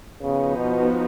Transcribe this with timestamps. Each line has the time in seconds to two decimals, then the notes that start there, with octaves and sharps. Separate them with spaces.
0.22 C#3 F3 B3 D#4 F#4
0.57 B2